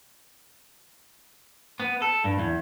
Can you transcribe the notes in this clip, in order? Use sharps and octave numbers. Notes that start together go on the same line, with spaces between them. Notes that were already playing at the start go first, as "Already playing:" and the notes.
B3
A4
G2
E2